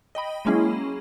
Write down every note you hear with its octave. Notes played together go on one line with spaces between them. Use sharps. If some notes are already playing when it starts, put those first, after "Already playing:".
D#5 G5 B5
F#3 G#3 A#3 C#4 E4 G#4